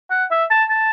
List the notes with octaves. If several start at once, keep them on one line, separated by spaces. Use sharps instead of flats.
F#5
E5
A5
A5